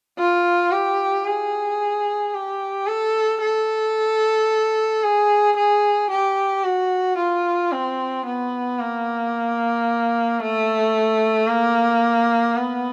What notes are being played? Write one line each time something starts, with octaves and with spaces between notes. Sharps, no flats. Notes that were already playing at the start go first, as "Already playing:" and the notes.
F4
G4
G#4
G4
A4
A4
G#4
G#4
G4
F#4
F4
C4
B3
A#3
A3
A#3
B3